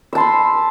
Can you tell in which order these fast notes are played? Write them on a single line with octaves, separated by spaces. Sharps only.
E6 A5 C6 B5